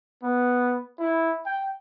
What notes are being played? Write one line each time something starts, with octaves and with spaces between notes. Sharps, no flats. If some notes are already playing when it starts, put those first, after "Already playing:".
B3
E4
G5